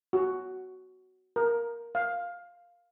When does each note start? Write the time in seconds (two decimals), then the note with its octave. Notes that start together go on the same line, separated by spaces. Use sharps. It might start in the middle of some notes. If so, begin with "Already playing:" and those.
0.13 F#4
1.36 A#4
1.95 F5